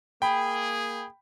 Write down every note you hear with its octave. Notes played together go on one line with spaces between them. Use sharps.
A#3 G#4 G5 B5